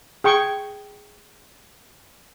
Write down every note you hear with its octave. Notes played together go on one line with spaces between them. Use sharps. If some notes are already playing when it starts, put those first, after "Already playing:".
G#4 G5 C#6